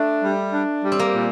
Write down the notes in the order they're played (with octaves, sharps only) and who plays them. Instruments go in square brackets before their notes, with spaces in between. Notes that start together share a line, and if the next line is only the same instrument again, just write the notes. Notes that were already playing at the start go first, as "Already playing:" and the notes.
Already playing: [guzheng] A3 [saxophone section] D4
[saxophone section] G3
D4
G3
[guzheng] C4
A#3
[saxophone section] A#2